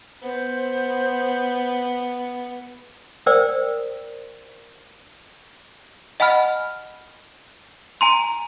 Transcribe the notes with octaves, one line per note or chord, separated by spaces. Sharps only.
B3 C5
A#4 C5 D5 G5 D#6 E6
D#5 F#5 G#5 B5 F6
G#5 A#5 C6